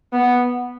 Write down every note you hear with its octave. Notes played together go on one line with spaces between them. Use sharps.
B3